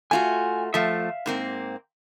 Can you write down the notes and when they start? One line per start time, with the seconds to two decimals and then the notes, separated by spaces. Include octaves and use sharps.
0.11 A3 F4 F#4 G#5
0.74 F3 A3 E5 F5
1.26 G#2 A#3 C4